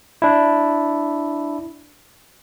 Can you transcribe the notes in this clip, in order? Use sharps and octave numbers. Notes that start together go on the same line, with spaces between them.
D4 E4